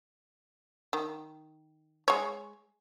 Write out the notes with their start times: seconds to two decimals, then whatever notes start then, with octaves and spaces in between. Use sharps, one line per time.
0.93 D#3
2.08 G#3 C#5